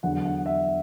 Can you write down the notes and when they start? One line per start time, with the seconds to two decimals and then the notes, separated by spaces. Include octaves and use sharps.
0.03 E2 D3 F#3 F#5
0.25 F#5
0.46 E5